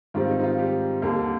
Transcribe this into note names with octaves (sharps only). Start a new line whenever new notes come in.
G#2 D#3 G3 C4 F4
D#4
D#4
F4
G3 G4
D#2 D3 G3 A#3